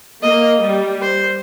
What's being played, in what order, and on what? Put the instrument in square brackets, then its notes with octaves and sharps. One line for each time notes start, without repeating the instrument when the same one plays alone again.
[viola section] A#3 [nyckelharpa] D#5
[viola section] G3
[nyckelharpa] C5